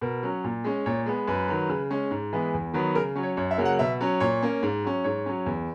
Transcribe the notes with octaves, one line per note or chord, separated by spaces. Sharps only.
B2 A#4
F#3 C#4
A#2
G#3 C#4
A#2 C#5
G#3 B3
F#2 B4
D#3 F#3
C#3
G#3 C#4
G#2
E3 G#3 B3
E2
D#3 F#3 B3
C#3 A#4
F#3 C#4
C#5
F#2 C#5
E5
C#3 F#3 A#3
F#5
B2 E5
F#3 C#4
A#2 C#5
A#3 C#4
G#2
F#3 C#4
G#2 C#5
F#3 C#4
E2